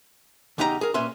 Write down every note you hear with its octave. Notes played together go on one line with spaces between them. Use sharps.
E2 C#3 D#4 G4 A#4 A#5
G#4 A#4
A#2 C#4 B4 E5 C6